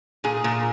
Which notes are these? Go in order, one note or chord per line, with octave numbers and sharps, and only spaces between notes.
A#2 G#4
A#2